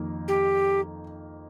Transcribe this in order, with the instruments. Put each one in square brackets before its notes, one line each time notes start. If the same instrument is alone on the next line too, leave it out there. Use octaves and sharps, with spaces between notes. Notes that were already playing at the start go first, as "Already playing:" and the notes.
Already playing: [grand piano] F2 D#3 A#3
[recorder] G4